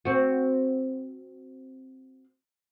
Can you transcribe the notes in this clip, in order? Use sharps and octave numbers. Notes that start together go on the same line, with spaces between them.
C4 F#4